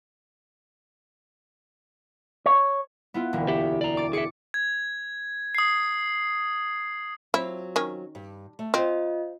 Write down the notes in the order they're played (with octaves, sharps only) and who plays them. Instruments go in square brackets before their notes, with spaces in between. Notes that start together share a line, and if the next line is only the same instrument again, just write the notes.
[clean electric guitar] C#5
[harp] B3 E4 F4
E1 D2 A#3
[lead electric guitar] G4 E5
D5 A#5
[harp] D6 A6
[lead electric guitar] G#4 E5 [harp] D6 C#7
[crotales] G#6
D#6 C7
[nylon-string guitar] F#3 C4 F4 [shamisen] E4
[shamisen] D#3 C#4
[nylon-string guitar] G2
A3
[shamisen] C4 [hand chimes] F4 D#5 [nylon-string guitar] C5 F5